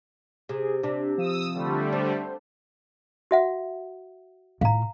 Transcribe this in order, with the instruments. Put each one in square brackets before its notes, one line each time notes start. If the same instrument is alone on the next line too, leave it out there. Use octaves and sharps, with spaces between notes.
[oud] C3 [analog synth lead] G#4
[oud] C3 [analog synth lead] D4
[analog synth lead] F3 [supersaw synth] D#6 E6
[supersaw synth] D3 G3 A3 [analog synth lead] F3
[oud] D4 [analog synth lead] C5
[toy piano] F#4 E5 F#5
[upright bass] A2 F4 [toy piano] F5 A#5